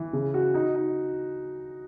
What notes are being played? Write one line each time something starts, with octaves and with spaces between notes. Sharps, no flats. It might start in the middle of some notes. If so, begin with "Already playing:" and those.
Already playing: E3
C#3
F#4
D#4
D#4